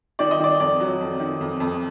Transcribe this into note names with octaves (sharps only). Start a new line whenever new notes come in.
D#3 D5
D#5
D#3 D5
F2 D5
F#3
F2
D#3
F2
F2